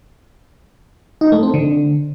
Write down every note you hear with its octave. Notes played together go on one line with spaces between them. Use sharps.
D#4
A3
C4
D3